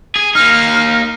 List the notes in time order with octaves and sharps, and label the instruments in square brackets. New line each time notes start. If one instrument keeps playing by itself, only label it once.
[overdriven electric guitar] G#4
[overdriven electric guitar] A#3 D#4 [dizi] F6